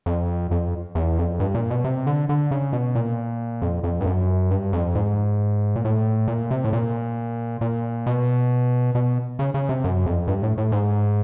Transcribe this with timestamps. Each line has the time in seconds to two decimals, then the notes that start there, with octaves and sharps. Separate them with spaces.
0.06 F2
0.51 F2
0.95 E2
1.18 F2
1.40 G2
1.55 A#2
1.70 B2
1.84 C3
2.07 D3
2.29 D3
2.51 C#3
2.73 B2
2.95 A#2
3.62 F2
3.84 F2
4.01 G2
4.06 F#2
4.50 G2
4.73 F2
4.95 G#2
5.76 A#2
5.84 A2
6.28 A#2
6.51 C3
6.64 A2
6.73 A#2
7.61 A#2
8.06 B2
8.95 B2
9.39 C#3
9.54 C#3
9.69 C3
9.84 F#2
10.06 F2
10.27 G2
10.43 A2
10.58 A2
10.72 G#2